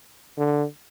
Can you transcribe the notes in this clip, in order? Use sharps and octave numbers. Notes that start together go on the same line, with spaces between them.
D3